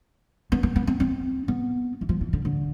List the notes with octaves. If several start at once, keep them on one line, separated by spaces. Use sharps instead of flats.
B3
B3
B3
C4
C4
B3
E3
F3
E3
D3
D3